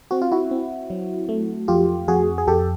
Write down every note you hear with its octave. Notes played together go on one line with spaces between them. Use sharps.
C4 F#4
F4
E4 F#4
C4
F#3
A3
F2 F4 G4
F2 F#4 G#4
G#4
F2 G4 A4